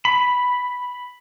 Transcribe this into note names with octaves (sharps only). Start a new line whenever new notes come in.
B5